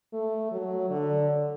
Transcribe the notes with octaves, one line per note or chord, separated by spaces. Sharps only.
A3
F#3
D3